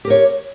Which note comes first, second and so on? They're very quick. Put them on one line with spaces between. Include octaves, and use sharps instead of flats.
G4 A#4 C#5